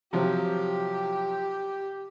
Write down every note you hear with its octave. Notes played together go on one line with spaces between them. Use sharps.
C3 F3 F#3 G4